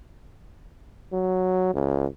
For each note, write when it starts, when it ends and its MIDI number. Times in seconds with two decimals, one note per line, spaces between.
1.13 1.74 54
1.74 2.07 37